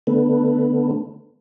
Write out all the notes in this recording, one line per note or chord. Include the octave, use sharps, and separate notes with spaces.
D3 A3 B3